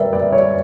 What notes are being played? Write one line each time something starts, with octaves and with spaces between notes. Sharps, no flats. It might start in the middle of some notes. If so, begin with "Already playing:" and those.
Already playing: G3 A#4 B4 D5 E5
D5
C#5